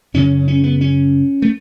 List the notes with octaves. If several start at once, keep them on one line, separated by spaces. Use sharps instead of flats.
F#2 C#3 C#4
C#4
B3
C#4
A3